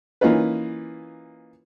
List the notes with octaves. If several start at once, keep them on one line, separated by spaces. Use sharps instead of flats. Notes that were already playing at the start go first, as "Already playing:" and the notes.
E3 A#3 C#4 D#4 F4 B4